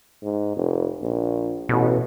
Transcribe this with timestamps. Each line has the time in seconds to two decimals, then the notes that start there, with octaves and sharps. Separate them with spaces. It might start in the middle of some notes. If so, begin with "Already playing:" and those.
0.23 G#2
0.56 F1
1.01 A#1
1.69 A1 B2